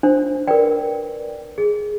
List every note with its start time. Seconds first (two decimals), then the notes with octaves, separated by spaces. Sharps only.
0.03 D4 C5
0.47 A#4 B4 D5 G5
1.58 G#4